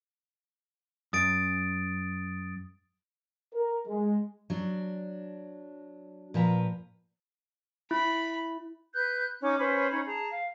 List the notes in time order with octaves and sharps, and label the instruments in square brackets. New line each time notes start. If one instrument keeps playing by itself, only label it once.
[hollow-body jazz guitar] F#2 [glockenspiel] D#6 A6 D7
[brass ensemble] A#4
G#3
[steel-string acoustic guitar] F#3 D4
A#2 F3 B4 A5 A#5
[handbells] E4 [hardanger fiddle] B5
[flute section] B4 F#6 G6
C#4 D#4 D6
C#4 B4 C5 B5
C#4 D#4 C#5 B5
G#4 A5 A#5
F5